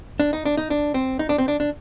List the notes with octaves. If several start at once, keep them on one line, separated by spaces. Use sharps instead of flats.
D4
D#4
D4
D#4
D4
C4
D#4
D4
C4
D4
D4